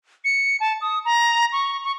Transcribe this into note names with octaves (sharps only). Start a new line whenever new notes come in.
C#7
A5
D#6
A#5
C#6
C#6